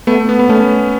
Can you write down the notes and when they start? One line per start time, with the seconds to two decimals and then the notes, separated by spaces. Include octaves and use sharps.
0.07 A3 B3
0.29 B3
0.39 B3
0.49 A3 C#4